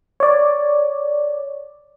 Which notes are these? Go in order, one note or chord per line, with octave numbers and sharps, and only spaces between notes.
C#5 D5